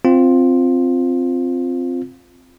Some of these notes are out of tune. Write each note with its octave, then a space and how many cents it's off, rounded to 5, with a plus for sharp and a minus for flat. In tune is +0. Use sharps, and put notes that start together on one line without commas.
C4 +0 F4 +5